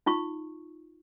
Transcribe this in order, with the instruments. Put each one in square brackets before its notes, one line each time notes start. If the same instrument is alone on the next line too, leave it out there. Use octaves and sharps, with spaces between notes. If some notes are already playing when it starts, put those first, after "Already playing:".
[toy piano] D#4 F4 C#6